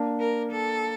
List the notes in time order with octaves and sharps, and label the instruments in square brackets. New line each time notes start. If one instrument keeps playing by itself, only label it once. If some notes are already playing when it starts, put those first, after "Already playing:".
Already playing: [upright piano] A#3 D4
[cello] A#4
A4